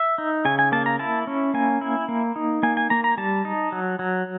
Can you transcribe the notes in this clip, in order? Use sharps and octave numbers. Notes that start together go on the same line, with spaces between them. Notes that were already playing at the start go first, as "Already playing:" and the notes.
Already playing: E5
D#4
C#3 G#5
G#5
A#3 A5
A#5
E4 A5
C#4
A#3 G#5
E4
A#3
D#4
A#3 G#5
G#5
A#3 A#5
A#5
G3 A5
D#4
F#3
F#3